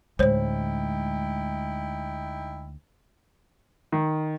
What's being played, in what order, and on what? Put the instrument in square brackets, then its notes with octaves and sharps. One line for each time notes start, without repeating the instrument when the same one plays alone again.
[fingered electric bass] D2 [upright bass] A2 G#3 [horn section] D#4 E4 G5 [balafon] C5 C#5
[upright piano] D#3